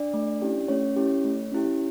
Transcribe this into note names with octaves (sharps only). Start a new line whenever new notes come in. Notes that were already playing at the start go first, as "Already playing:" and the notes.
Already playing: D4 D5
A3
C#4 E4 G4
A3 C#4 C#5
C#4 E4 G4
A3
C#4 E4 G4